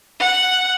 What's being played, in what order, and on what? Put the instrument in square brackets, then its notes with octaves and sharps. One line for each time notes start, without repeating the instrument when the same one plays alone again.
[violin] F#5